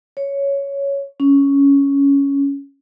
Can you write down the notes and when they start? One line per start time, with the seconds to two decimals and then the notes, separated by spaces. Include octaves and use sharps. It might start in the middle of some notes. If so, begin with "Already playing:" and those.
0.17 C#5
1.20 C#4